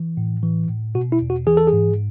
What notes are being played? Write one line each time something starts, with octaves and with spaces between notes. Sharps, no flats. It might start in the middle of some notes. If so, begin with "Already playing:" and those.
Already playing: E3
A2
E3
A2
B2 F#4
E4
E2
F#4
E3 G#4
A4
G#4
G#2